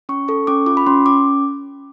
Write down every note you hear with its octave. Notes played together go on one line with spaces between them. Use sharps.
C#4 C#6
A4 C#6
C#4 D6
F4 D6
B5
C#4 C6
C#4 D6